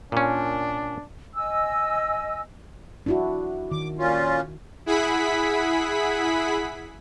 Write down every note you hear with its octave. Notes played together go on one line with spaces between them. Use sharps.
A#2 C#4 D4
D#5 G#5 E6
D4 E4 F#4
D#3 D6
A#2 C#4 F4
E4 G#4 F#5 B5 B6